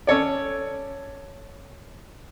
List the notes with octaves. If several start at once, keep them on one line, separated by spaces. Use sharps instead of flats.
C#4 A4 C#5 D5